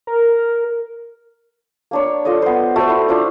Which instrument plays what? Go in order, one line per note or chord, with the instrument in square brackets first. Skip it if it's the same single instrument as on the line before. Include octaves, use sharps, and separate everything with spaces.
[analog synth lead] A#4
[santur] A#3 D4 C#5
F4 A4 D5 D#5
B3 C5
A3 F#4 A4 C5
E4
D4 E4 F4 C5